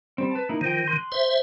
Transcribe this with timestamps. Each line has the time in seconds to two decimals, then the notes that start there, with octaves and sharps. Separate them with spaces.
0.18 G3 C4
0.31 B4 A5
0.49 A#3 D#4 E4
0.61 D#3 F3 G5
0.88 C6 F#6
1.12 C5 E5